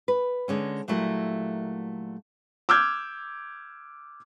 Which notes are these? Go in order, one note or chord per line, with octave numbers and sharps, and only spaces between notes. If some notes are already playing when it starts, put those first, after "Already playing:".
B4
D3 G#3 C#4
A#2 F#3 G3 A3 E4 A#4
D6 E6 F6 G6 G#6